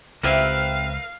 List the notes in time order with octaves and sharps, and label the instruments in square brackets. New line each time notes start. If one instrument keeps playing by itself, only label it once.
[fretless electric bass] C#2 [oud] C4 E4 G4 [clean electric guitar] A#4 B4 E5 [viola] F5